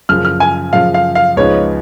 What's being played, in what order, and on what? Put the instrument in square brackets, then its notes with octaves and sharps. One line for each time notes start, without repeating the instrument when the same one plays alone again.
[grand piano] F#2 C#3 F3 [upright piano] F6
[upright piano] F6
G#5
[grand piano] F#2 C#3 F3 [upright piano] F5
[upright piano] F5
F5
[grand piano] C#2 C#3 F3 B3 D#4 [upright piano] C#5